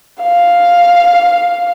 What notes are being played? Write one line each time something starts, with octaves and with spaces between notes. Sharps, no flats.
F5